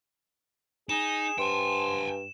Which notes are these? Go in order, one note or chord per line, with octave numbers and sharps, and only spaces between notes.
D#4 G#4 E7
G2 C5 G5 G#5